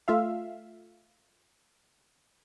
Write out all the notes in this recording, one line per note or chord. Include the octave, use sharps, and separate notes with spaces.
A3 F4 E5 F5